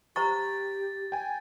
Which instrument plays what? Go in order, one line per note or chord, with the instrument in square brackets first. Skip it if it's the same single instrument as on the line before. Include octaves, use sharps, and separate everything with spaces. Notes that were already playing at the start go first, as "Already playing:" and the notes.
[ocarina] G4 [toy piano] C5 A#5 C#6 [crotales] A6
[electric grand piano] G5 G#5